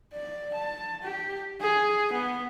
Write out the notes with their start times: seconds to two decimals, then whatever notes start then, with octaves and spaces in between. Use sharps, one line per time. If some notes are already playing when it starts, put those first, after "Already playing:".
0.13 D5
0.54 A5
1.03 G4
1.61 G#4
2.13 B3